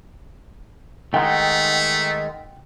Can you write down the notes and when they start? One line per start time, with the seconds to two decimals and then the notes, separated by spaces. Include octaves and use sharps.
1.14 D#3 G#3 A3 D#4 F#5 G5